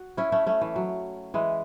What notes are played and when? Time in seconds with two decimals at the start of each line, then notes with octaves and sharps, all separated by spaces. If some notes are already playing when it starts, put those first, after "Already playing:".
Already playing: F#4
0.17 C#4 E4
0.32 A3 C#4
0.47 A3 C#4
0.61 E3
0.76 F#3
1.34 E3 G#3